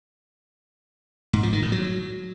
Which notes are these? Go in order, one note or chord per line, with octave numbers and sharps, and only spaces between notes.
G#2
F3
D#3
A2
F#3